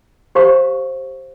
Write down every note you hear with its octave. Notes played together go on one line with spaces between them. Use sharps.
G4 C5 F5 A#5 C#6